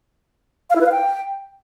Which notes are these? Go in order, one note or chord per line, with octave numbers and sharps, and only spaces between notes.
F5
E4
B4
F5
G5